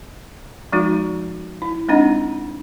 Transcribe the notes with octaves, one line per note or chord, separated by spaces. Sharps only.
F3 G#3 D#4 F#4
E4
G#3 C4 D4 D#4 D#5 F#5